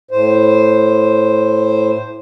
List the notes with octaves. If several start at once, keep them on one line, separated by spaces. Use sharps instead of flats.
A2 C5